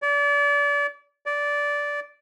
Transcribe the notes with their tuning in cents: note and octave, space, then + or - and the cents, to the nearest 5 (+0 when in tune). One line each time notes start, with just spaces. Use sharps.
D5 -35
D5 -15